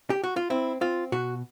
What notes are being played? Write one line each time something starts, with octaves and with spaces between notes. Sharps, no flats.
G4
F#4
F4
C4 E4
C4 F4
B2 F#4